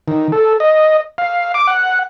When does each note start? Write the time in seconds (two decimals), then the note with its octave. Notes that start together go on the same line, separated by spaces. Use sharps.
0.08 D#3
0.32 A4
0.60 D#5
1.18 F5
1.54 D6
1.67 F#5